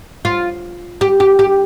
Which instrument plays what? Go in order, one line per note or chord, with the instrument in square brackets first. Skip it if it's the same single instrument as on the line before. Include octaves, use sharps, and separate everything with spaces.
[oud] F4
G4
G4
G4